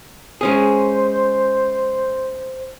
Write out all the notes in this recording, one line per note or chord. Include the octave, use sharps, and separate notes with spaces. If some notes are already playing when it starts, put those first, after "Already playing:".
G#3 C#4 G#4 C5